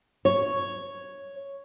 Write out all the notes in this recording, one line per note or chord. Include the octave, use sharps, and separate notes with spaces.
C#5